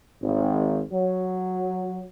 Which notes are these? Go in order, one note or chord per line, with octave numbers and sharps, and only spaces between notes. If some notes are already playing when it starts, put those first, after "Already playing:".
G#1
F#3